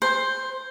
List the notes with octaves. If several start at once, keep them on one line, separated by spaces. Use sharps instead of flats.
C5